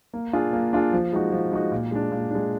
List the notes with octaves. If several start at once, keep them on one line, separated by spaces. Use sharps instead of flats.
A#3
D4 F4 G#4
A#3
D4 F4 G#4
F3
G#3 D#4 F#4
F3
G#3 D#4 F#4
A#2
G#3 D4
A#2
G#3 D4